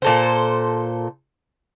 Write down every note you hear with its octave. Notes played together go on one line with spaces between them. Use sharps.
A#2 A4 C5